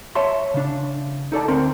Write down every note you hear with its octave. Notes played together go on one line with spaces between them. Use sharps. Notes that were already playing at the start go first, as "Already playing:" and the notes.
C#5 E5 A5 C6
C#3 D4
D#4 A4 D5 A5
D2 C4 A#4 C6